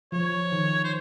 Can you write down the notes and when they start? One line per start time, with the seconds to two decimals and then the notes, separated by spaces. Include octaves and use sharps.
0.12 F3 C#5
0.52 D#3
0.84 C5